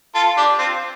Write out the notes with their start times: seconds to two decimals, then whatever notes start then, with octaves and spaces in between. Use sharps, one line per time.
0.15 F4 A4
0.37 D4 G4
0.59 C4 F4